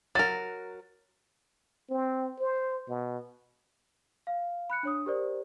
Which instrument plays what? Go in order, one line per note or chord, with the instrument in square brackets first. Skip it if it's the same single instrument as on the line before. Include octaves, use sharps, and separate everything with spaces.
[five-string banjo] F#3 A#4 [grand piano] A6
[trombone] C4
C5
B2
[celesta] F5
B5 F#6 C#7
D4 C#5 D#6
G4 A#4 C5 D5